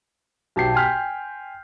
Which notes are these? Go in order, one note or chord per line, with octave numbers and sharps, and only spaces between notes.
B1 B2 G4 A5 G6 C7
G5 G#5 C6 F6 G6 B6